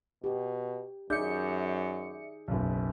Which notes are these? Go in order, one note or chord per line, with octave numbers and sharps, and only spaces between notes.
B2 G4
F#2 D#4 G#4 D5 E5 G6 C#7
F#1 B1